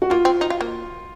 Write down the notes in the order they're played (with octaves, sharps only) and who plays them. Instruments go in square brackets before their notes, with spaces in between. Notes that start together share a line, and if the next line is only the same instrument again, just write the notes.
[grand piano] F#4
[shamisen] A#3 [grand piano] F4
[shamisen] C4
D#4
F4
A#3